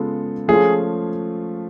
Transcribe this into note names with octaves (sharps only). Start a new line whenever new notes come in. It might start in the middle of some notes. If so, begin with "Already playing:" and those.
Already playing: C#3 G#3 B3 F4 A4
F3 A3 C#4 F4 G#4